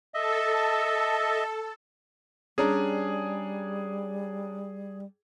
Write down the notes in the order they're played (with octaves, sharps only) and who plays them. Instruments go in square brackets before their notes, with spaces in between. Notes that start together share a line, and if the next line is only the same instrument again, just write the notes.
[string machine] A4 [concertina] D#5 E5
[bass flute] G3 [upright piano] C#4 D4 A#5 [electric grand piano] G#4